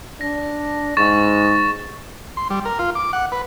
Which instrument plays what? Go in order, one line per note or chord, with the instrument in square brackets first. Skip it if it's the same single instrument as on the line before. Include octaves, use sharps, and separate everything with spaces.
[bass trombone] D4 [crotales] A#6
[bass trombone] G#2 [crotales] C#6 A6 E7
[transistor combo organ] C6
G3
A#4
F4
D6
F#5
B4